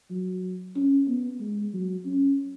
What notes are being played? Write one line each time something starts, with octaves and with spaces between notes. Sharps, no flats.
F#3
C#4
B3
G#3
F#3
C#4